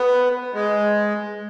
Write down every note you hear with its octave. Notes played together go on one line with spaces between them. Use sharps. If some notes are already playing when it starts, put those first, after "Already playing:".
Already playing: B3
G#3